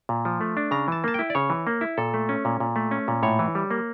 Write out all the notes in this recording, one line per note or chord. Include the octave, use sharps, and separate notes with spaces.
A#2
F3
A3
D4
C#3 A#5
E3 A5
A#3 A5
E4 G5
D5
C#3 C#5
E3
A#3
E4
A#2 A4
A3
C#4
A#2
A#2
A3
C#4
A#2
A2 C#5
E3
G3
A#3